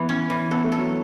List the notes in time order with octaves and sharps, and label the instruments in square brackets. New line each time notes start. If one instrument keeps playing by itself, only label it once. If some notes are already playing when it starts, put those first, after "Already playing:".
Already playing: [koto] E3 [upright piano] B3
[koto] C#4
E3
[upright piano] B3 [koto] A4
[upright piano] A3
[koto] A4
[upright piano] F#3